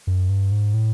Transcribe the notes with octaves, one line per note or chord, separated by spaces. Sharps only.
F#2
G2
G#2
A2